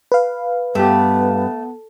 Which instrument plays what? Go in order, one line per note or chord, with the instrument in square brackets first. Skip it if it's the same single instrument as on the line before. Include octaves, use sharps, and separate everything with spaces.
[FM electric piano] B4 F5
[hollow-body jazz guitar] G2 G4 [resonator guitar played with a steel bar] A3 [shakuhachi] B3